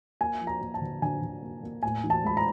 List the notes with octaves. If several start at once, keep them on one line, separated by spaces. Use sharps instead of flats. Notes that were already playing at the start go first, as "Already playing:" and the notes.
A#3 G#5
F3
A#5
A#3
A5
D3
D3 G#5
D3
A#3
A#3
A2 G#5
E3
A5
G#3 B5
A#5